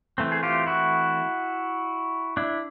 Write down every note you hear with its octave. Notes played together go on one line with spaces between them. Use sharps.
E3 A3 C4
G#4
F4 G4
E4 F#4
D4 E4